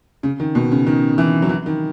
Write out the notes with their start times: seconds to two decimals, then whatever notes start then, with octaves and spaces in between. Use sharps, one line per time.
0.23 C#3
0.40 D#3
0.55 B2
0.72 C#3
0.86 D#3
1.18 E3
1.42 F#3
1.49 E3
1.66 D#3